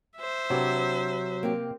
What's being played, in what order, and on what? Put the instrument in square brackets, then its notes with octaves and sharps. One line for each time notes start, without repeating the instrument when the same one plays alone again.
[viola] C5 E5
[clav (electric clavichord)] C3 B4 [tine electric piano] F#3 [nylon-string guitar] D4 G4
[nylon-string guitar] A#3 C4 G4